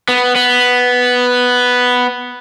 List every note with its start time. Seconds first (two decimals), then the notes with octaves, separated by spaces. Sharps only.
0.08 B3
0.36 B3